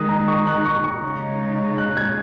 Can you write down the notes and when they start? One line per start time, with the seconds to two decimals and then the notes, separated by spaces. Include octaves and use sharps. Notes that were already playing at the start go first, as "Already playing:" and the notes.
Already playing: D#3 G#3 D#4 D#6 F#6
0.09 A#5
0.28 C#6
0.47 F#6
0.65 C#6
0.84 C#6
1.02 C#3 G#3 D#4
1.78 F#6
1.97 G#6